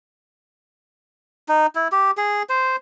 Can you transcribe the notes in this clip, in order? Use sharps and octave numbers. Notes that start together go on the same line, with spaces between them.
D#4
E4
G4
G#4
C5